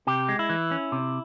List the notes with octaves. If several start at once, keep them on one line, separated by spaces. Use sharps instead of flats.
C3 G4
G#3
E4
E3
C#4
C3